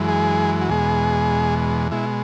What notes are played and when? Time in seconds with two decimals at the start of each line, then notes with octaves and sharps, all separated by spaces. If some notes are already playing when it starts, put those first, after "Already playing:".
Already playing: F#2 E3 G#3
0.08 G#4
0.61 F#4
0.69 E2 B2 G#3 G#4
1.91 B2 G#3 E4